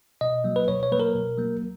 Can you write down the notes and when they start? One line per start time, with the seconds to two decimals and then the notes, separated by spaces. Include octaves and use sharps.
0.21 B2 D#5
0.44 F#3 A#3
0.56 B4
0.68 B2 C#5
0.83 C#5
0.92 F#3 A#3 B4
1.00 A#4
1.14 B2
1.38 F#3 A#3